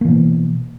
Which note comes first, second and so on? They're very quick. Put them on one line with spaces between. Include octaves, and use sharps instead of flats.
A#3 E3 B2